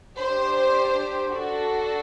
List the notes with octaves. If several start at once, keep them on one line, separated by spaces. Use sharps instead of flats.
D4 G4 C5
D4 F#4 A4